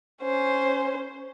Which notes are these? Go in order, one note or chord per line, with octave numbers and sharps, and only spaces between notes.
C#4 C5